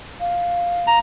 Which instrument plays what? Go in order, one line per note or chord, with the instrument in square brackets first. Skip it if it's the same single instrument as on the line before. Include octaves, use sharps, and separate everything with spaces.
[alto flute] F5
[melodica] A#5